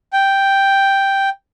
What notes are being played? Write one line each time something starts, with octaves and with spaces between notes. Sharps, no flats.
G5